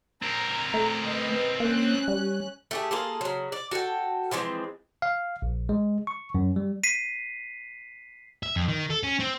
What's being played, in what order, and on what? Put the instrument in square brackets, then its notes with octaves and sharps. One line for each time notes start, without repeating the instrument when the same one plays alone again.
[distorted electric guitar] C4 A#4 [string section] A#5
[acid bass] A3
[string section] B4 D#5
[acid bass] A#3 [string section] C#4 F#6
[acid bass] G3
[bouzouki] A3 G4 G#4
A#3 F4 G#4 A4
C#3 F#3
D5
F#4 A4 C#5 G5
E3 F3 G#3 C4
[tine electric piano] F5
A#1
G#3
C#6
F#2
G3
[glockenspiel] B6 C7 D#7
[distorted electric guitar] E5
F2
D#3
A4
C#4
C4